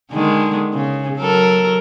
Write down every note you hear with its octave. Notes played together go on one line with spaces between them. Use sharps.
D3 D#3 G#3
C#3
F#3 A4 A#4